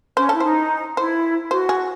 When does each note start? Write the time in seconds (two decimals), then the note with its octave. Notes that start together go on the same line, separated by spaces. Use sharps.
0.17 C#4 C5
0.29 A4
0.35 E4
0.40 D#4 C5
0.97 E4 C5
1.51 F#4 C5
1.69 G#4